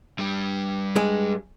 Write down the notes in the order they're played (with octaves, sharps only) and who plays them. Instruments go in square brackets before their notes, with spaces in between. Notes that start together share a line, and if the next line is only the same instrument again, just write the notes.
[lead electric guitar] G2 G3
[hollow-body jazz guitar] G#3